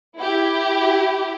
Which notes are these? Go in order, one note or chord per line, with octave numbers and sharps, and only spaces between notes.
E4 G4